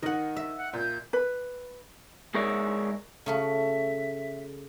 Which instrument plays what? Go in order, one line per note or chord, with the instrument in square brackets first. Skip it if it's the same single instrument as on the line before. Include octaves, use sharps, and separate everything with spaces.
[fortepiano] D#3 [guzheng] D#5 F#5
[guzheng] E5
[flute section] F#5
[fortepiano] A#2 [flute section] G6
[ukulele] B4
[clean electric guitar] G#3 G#4 A#4 C#5 D5 E5
[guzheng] C#3 A3 F#4 [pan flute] E5